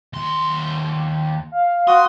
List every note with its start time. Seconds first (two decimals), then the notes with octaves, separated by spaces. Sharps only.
0.13 D#2 C6
1.52 F5
1.88 F#4 C6 D#6